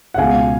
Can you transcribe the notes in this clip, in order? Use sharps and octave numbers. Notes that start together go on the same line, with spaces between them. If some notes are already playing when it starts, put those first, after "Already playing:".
F#5
C#2 B2 G#3 F5 G#5